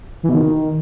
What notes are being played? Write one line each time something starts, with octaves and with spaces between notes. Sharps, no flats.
E3
B2
D#3